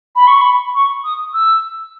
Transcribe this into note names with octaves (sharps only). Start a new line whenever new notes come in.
B5
C#6
B5
C#6
D#6
E6